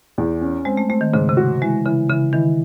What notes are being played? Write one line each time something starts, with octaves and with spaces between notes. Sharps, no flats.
E2
C#4
G#3 C4
A3
A3 C4
D#3
G#2 C#3
C3
F#4
E3 G#3
C#3 E3
C#3 E3
D#3 E3